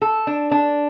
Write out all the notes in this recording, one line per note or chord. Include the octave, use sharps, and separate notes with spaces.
A4
D4
D4